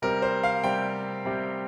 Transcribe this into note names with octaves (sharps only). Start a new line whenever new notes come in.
C3 G3 C4 A#4
C5
F5
C3 G3 C4 G5
C3 G3 C4